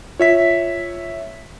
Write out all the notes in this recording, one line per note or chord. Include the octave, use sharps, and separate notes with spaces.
F4 C#5 E5 B6